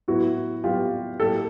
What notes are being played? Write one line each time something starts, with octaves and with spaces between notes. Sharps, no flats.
A2 F#3 B3 E4 F#4
A2 F#3 B3 F4 G4
A2 F#3 A#3 G4 A4